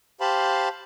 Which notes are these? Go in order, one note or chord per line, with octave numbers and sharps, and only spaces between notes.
G4 C5 F5 A5 B5 C6